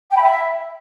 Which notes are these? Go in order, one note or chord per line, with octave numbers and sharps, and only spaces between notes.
G5
B5
E5